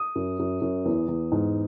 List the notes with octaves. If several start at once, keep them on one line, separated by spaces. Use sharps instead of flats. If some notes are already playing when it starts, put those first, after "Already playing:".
Already playing: D#6
F#2
F#2
F#2
E2
E2
G#2